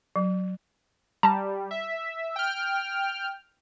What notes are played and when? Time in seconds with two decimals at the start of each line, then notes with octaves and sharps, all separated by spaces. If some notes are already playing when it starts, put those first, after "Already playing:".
0.16 F#3
1.23 G3 A5 A#5
1.71 E5
2.36 G5 F6